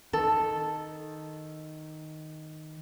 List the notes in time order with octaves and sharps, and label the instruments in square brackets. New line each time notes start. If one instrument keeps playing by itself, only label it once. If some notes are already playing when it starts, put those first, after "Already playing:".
[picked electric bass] D#3 [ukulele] A4